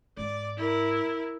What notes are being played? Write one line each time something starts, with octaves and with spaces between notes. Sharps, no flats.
G#2 D5
E4 A#4